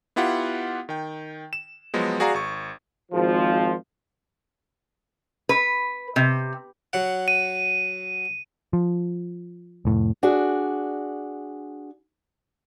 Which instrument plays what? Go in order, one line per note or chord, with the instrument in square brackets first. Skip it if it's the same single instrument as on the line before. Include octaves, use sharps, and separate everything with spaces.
[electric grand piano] B3 E4 F4 G4 F#5
D#3 G5
E7
F3 F#3 G#3 B3
F#4 G#4 D5 F5 A#5
G#1 C#6
[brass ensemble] G#1 F3
[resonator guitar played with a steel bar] B4
C3
[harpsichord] F#3 F#5
[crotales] D#7
[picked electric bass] F3
F1 A2
[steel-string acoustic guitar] D4 F#4 G#4